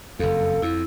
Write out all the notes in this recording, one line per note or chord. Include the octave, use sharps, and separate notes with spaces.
F#1 F2 A4 F5
F2 E4